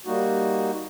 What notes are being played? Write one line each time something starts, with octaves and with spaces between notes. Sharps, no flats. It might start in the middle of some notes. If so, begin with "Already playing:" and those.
G3 A#3 D#4 F#4